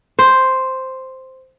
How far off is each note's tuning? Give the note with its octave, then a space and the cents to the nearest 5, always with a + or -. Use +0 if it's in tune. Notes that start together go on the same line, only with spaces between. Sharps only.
C5 +0